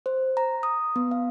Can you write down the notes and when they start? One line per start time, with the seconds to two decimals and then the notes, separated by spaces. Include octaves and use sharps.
0.06 C5
0.37 A#5
0.63 D#6
0.96 B3
1.11 F5